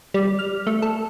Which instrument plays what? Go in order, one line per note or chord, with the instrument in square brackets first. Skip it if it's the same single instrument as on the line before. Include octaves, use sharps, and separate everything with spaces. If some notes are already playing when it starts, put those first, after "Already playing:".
[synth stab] G3
F6
A3
A4